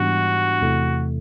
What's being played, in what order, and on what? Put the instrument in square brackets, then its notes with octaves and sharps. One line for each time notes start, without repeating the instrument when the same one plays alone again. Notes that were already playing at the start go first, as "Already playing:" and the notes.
Already playing: [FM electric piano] G#2 E3 G3 B3 D4 [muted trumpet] F#4
[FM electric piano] E2 C3 E3 A3